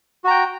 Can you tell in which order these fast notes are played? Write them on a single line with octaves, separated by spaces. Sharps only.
F#4 A#5 G5